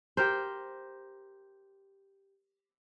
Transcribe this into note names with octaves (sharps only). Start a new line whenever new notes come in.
G4 A#4 C5